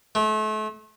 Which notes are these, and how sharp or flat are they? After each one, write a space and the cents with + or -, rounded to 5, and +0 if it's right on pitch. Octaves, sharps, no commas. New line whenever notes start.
A3 -35